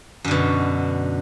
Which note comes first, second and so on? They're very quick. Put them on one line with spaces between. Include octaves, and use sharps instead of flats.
F#2 D3 B2